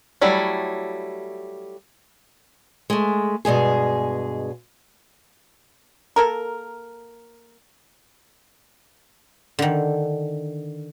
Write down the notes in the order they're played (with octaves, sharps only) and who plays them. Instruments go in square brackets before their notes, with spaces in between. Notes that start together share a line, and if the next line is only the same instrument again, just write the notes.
[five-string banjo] F#3 G3 A3 E4
[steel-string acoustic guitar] G#3 A3
G2 B2 G#3 G#4
[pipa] A#3 A4 A#4
[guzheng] D3 D#3